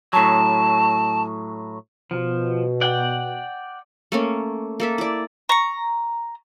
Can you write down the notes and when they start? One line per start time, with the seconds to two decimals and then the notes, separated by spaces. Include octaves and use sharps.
0.13 A2 F#3 A5
2.11 B2 F3
2.81 D5 F#5 G5
4.12 A3 A#3 C#4
4.80 A#3 A4 E5
4.98 E4 D5
5.49 A#5 C#6 C#7